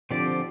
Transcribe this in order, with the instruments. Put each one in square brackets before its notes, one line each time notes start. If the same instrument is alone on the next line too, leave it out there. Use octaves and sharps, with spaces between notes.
[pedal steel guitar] D3 F3 C4 G4 D5